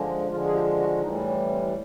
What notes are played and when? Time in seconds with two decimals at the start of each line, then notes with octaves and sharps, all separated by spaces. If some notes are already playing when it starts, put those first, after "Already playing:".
Already playing: D3 F3 G#3
0.29 D3 F3 G#3 F4
0.46 G#4
0.53 G4
0.78 F#4
1.01 A2 E3 G3 D#4
1.26 C#4
1.45 C#4
1.49 C4